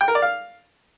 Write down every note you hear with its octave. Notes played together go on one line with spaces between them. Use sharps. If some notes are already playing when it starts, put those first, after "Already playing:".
G5
A#4
D5
F5